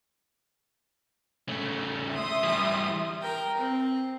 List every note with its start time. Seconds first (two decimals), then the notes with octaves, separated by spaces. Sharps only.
1.49 C#3 A3
2.11 E5 C6 D#6
2.43 E3 G3
3.22 A#4 G5
3.57 C4